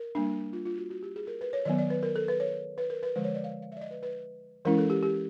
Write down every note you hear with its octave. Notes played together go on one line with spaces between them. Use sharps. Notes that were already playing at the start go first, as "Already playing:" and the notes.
Already playing: A#4
G3 A#3 D4
F4
F4
F#4
F#4
G4
G#4
A#4
B4
C#5
D#3 F#3 B3 D5
D5
B4
A#4
A4
B4
C#5
B4
A#4
B4
D3 F3 G#3 C5
C#5
D5
F5
F5
E5
D5
D#5
B4
B4
E3 G#3 C#4 E4 A#4
A4
G4
G4